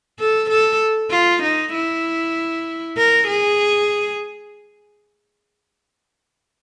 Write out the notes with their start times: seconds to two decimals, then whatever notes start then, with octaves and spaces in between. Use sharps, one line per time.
0.19 A4
0.50 A4
1.11 F4
1.43 D#4
1.73 E4
2.97 A#4
3.28 G#4